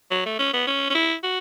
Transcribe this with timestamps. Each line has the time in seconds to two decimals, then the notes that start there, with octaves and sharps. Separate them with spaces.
0.11 F#3
0.26 A3
0.39 C#4
0.53 B3
0.68 C#4
0.90 C#4
0.95 E4
1.23 F#4